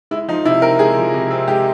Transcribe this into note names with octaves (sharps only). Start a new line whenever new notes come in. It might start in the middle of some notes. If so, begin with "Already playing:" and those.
G#3 E4
F3 D#4
C3 E4
C4 A#4
G#3 G#4
F3
C3
C4
G#3 G4